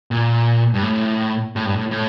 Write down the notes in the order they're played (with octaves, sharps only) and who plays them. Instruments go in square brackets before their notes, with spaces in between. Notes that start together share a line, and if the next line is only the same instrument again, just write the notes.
[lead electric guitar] A#2
G2
A2
A2
G2
A2
A2